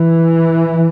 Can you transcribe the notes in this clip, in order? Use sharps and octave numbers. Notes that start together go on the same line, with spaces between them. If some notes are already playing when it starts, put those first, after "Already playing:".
Already playing: E3